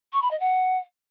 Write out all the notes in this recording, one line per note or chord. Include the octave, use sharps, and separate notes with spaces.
C#6
B5
D#5
F#5